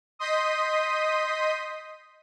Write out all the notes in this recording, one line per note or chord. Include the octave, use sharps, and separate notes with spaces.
D#5 C6 D#6 G6 B6 D#7